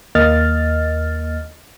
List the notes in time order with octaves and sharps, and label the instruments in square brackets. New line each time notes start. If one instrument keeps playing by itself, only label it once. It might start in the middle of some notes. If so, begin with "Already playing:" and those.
[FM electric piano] D#2 A#3 D#5 F6 A6